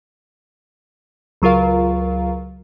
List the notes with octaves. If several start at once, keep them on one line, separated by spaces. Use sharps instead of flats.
C#2 F#3 F4 A#4 F5